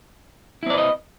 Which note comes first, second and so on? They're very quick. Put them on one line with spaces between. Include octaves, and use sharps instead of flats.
E4 C4 D5 B4 D#5